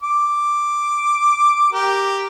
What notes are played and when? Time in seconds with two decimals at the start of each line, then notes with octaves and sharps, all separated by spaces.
0.02 D6
1.72 G4 A#4